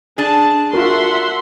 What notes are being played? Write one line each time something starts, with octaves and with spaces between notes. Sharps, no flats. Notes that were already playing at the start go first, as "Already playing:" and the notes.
D4 G#4 A5
F4 F#4 A#4 E5 F#5 C6